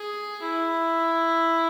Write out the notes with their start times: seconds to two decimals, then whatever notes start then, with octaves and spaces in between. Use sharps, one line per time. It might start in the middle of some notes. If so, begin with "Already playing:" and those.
Already playing: G#4
0.42 E4